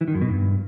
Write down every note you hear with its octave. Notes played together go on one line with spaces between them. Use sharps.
E3
D#3
F#2
B2
G2